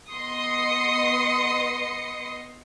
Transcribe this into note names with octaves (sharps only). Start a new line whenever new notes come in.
B3 D#5 C6 D#6 C#7